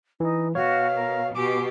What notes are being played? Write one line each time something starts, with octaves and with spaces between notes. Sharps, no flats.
E3 D#4
B2 F#4 C#5 F5
A#4
B2 G4 G#5 D6